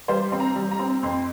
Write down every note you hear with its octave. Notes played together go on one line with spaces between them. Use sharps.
G3 C5
C4
A#5
G3
A#5
C4
F2 C6